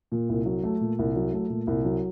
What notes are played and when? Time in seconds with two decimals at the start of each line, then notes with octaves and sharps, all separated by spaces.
0.12 A#2
0.29 C2
0.46 F#3
0.64 A3
0.81 A#2
0.99 C2
1.16 F#3
1.32 A3
1.50 A#2
1.67 C2
1.85 F#3